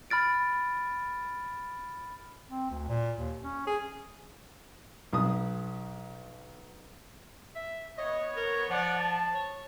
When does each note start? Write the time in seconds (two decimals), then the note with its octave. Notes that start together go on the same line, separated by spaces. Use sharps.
0.10 B5 F6 A6 D7
2.51 C4
2.70 D2
2.89 A#2
3.18 D#2
3.43 C#4
3.67 G#4
5.13 B1 D#6
7.56 E5
7.98 B3 C#5 D#5
8.37 A#4
8.70 F3 D5 F#5
8.99 A5
9.35 C#5